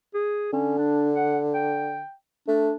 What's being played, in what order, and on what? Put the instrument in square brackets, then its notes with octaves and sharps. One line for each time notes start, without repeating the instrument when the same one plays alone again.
[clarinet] G#4
[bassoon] D3 [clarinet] C#4
[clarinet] D4
F#5
G5
[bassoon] A3 [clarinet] D4